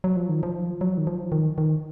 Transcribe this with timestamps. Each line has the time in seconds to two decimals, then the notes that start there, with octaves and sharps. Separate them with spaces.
0.04 F#3
0.16 F3
0.29 D#3
0.43 F3
0.81 F#3
0.98 D#3
1.07 F3
1.32 D#3
1.58 D#3